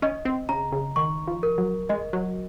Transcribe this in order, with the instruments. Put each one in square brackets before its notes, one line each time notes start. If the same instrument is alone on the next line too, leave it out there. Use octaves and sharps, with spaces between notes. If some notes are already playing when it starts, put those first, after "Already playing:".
[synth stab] C#4 [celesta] D#5
[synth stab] C4
[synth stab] C#3 [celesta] A#5
[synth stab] C#3
[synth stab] D#3 [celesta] C#6
[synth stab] F3
[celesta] A#4
[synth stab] F#3
[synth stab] G#3 [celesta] D#5
[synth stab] F#3